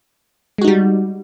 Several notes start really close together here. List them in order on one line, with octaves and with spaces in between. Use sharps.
G#3 F#4 D#4 G3